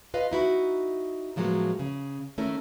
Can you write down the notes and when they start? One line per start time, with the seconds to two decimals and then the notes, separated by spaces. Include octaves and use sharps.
0.14 F4 B4 D#5 F5
0.31 D#4 E4 F#4
1.36 A2 F3 F#3 G#3 A#3 B3
1.79 C#3
2.38 D#3 A3 C#4 E4 A#4